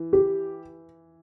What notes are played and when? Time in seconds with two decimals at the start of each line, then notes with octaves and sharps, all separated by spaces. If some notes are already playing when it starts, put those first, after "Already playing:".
Already playing: E3
0.13 G4